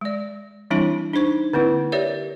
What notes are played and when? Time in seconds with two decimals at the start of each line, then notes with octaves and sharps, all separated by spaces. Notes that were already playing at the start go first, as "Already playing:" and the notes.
0.01 G#3 D5
0.70 E3 G3 C4 D4 E4 A5
1.14 D4 D#4 C5 C#6
1.53 D3 A#3 C4 E4
1.92 G4 A#4 C#5 D5 E5